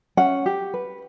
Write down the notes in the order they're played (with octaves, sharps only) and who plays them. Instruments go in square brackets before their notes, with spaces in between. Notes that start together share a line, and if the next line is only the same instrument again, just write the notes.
[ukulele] C#4 F#5
G4
B4